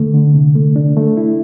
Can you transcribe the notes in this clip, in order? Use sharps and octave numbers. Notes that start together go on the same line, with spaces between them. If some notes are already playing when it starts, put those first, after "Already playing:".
Already playing: D3 A3
D3
C3
A3
D4
A3
E4